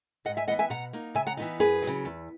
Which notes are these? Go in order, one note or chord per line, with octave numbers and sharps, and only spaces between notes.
G#2 D#5 F#5
E5 G#5
E3 B3 D#5 F#5
E5 G#5
B2 F#5 A#5
A#3 D#4
C#3 E5 G#5
F#5 A#5
E3 B3 D#4
F#2 G#4 B4
C#3 F#3
E2